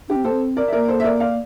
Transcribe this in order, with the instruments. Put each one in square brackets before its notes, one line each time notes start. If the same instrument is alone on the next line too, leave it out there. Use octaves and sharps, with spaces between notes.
[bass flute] D4 [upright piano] G4
[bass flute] C4
[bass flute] A#3 [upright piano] A4 C5
[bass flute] C4
[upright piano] A#4 D5
E5
[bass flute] A#3 [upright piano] A#4 D5
[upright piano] A4 C5
E5
A#4 D5
D5 F5